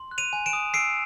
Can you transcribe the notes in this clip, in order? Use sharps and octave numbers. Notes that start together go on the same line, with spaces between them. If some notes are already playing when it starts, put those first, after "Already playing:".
Already playing: C6
F#6
D#7 F7
G#5
D7 E7
D#6
E6 C7 D7